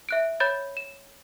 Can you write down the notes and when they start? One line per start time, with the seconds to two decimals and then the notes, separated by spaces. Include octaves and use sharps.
0.09 E5 F#6 D7
0.40 C#5 B5 G6 A6
0.77 E7